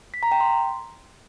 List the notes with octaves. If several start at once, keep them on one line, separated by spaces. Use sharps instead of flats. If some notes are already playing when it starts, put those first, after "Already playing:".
B6
A#5
G5
C6